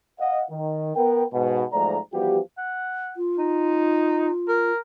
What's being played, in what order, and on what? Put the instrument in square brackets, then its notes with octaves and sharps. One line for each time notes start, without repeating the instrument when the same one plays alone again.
[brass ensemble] D#5 F5 F#5
D#3
B3 A#4 G5
G#2 B2
B1 G#2 F3 A3 D5 A#5
E3 F3 G3 B3 F#4 G4
[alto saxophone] F#5
[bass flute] F4
[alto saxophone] D#4
A#4